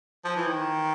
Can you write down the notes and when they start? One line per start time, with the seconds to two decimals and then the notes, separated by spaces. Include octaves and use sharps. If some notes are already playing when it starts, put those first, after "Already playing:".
0.25 F3
0.36 E3
0.48 D#3